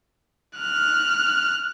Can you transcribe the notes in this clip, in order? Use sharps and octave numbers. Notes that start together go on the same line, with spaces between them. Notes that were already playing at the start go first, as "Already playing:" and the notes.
F6 F#6